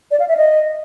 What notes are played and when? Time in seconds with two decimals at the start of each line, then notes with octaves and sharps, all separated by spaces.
0.11 D5
0.20 F5
0.28 E5
0.37 D#5